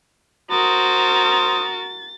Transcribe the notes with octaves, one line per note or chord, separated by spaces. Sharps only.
F#4 A#4 C5 D#6 A6